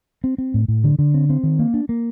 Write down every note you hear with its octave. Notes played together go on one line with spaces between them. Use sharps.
C4
C4
A2
A2
D3
D3
C4
C4
D#3
A#3
D4
A#3